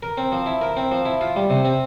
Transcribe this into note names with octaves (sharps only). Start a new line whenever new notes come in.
A#4
C4
F3
E4
A#4
C4
F3
E4
F4
G3
C3
C4